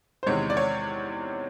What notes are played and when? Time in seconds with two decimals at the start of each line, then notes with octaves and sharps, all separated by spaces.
0.23 C5
0.27 E2 C3 D#3 G#3 C#5
0.50 D5
0.57 C#5